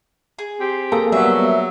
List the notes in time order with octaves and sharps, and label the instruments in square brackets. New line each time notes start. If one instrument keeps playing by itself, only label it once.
[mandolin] G#4
[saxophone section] C4 G4
[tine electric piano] A#3 G#4 A4 [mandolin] A#5
[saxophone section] F#3 [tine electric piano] G3 A#3 B3 [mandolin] G#4 E5